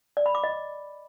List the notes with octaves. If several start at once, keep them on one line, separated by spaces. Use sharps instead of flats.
D5
B5
D6
D#5